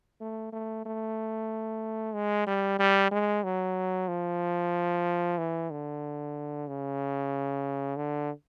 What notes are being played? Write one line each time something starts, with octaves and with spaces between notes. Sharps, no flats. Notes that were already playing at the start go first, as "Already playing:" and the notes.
A3
A3
A3
G#3
G3
G3
G#3
F#3
F3
E3
D3
C#3
D3